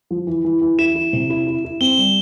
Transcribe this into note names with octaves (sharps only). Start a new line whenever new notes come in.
F3
E3
E3
E3
E4 E7
E4
C3
E4
E4
E4
C4 G7
G3